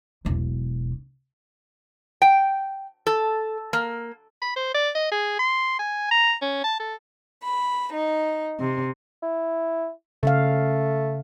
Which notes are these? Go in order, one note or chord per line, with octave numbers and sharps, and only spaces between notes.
E1 B1
G5
A4
A#3
B5
C5
D5
D#5
G#4
C6
G#5
A#5
C#4
A5
A4
B5
D#4
C3
E4
C#3 A3 C#4 F5